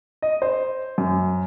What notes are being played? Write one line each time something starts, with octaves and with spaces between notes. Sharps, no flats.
D#5
C5
F#2